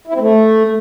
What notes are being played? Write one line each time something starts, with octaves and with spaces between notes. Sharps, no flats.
E4
C4
A3